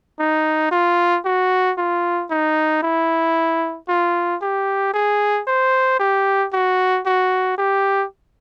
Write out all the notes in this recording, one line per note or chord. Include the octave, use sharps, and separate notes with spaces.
D#4
F4
F#4
F4
D#4
E4
F4
G4
G#4
C5
G4
F#4
F#4
G4